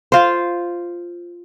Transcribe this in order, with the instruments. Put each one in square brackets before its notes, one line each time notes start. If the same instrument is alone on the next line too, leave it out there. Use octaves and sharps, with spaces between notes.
[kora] F4 C5